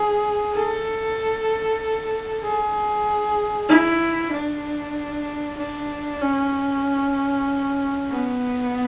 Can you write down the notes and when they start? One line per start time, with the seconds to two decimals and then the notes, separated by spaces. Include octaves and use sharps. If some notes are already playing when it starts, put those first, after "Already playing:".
Already playing: G#4
0.53 A4
2.42 G#4
3.69 E4
4.32 D4
5.58 D4
6.21 C#4
8.10 B3